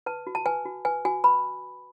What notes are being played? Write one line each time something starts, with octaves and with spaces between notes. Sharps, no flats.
B4 A5
F#4
A5
B4 G#5
F#4
B4 G#5
F#4 G#5
B4 B5